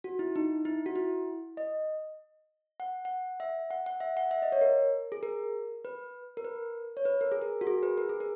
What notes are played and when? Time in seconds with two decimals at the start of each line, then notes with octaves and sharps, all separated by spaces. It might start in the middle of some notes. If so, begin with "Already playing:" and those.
0.04 F#4
0.19 E4
0.36 D#4
0.65 E4
0.86 F#4
0.96 E4
1.57 D#5
2.80 F#5
3.05 F#5
3.40 E5
3.71 F#5
3.86 F#5
4.00 E5
4.17 F#5
4.31 E5
4.42 D#5
4.52 C#5
4.61 A#4
5.12 G#4
5.23 A#4
5.85 B4
6.37 A#4
6.45 B4
6.97 C#5
7.05 B4
7.21 A#4
7.32 G#4
7.41 A#4
7.61 F#4
7.67 G#4
7.83 B4
7.98 A#4
8.09 G#4
8.20 A#4